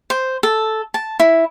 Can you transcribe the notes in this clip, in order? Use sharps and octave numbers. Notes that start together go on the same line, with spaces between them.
C5
A4
A5
E4